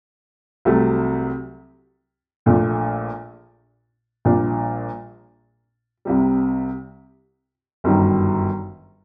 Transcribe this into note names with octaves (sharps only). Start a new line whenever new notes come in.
C2 C3 F#3 A3
A#1 A#2 A3 D4
A#1 A#2 G3 D4
C2 C3 G3
G1 F#2 D#3 G3